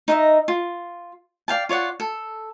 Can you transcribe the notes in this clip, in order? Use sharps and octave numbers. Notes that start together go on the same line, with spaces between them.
D#4 D#5 E5
F4
D5 F5 G5 A5
F4 C#5 D5 F#5
A4